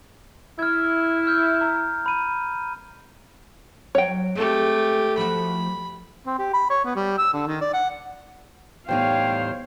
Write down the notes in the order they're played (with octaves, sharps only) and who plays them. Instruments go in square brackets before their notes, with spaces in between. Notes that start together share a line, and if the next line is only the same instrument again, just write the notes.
[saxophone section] E4 [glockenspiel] F6 G#6
[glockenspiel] F6 G6
A#5
B5 D#7
[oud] F#3 [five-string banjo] C#5 G5
[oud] G#3 C4 A4 [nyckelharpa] A3 G4
[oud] F3 A3 F#4 [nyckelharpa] B5
[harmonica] C4
G4
B5
C#5
B3
G3
E6
D3
D#3
D5
F#5
[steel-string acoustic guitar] E2 G3 D#4 [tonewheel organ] A2 C5 [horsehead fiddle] C#5 F5 [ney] G5